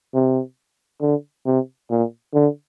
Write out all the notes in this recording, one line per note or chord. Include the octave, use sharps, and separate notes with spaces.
C3
D3
C3
A#2
D3